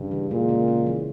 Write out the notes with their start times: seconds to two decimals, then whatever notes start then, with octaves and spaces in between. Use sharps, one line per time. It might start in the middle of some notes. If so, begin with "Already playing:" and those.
Already playing: G2 C#3
0.11 E3
0.31 A#2 G#3
0.49 C#3
0.68 C#3
0.86 E3